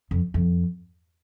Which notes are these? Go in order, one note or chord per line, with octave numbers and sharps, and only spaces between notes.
F2
F2